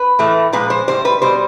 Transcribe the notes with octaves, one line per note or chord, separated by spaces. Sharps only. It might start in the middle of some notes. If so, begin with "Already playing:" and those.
Already playing: B4
A2 E3 A3
A#2 F3 G#3 B4
C5
A2 E3 G3 C5
B4
B2 G3 C5